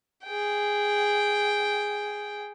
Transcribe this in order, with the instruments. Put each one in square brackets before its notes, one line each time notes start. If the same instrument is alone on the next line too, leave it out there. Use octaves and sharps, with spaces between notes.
[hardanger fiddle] G#4 G5